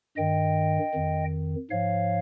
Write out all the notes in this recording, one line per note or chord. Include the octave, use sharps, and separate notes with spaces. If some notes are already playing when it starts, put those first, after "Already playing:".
G2 D#3 D#5 G5
F2 D#3
G#2 F3 C#5 F5